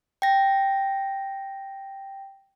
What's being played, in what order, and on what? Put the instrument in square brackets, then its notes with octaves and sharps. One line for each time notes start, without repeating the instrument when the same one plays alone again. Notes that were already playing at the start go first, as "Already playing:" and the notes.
[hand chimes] G5 A#6